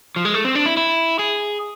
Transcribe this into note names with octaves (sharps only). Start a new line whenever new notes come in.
F3
G#3
A3
C4
D4
E4
E4
G#4